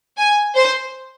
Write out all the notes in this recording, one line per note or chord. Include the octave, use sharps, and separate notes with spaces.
G#5
C5